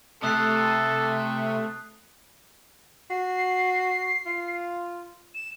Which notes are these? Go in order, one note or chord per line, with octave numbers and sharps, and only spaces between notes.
C3 A3 A4 D#6 F#6 C7
F#4 C7
F4
E7